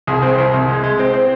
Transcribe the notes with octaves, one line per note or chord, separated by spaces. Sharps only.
C2 G#4
C4
C2
C2
G#3
G#3
C4
C4